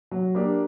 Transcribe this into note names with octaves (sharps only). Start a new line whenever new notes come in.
F#3
A#3 D4 G4